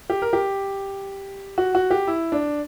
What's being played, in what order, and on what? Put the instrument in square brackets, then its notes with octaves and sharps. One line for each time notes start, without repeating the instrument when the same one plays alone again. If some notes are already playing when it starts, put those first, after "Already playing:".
[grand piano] G4
A#4
G4
F#4
F#4
G4
E4
D4